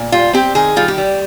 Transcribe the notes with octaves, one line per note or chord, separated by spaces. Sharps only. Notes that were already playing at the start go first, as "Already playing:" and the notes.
Already playing: A#2
G3 F4
C4 G4
D#3 G#4
G3 F4
G4
G3